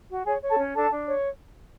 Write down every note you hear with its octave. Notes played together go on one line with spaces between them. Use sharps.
F#4
G#4 C#5 G#5
C#5
A4 A5
C#4
D4 A4 A5
D4
C#5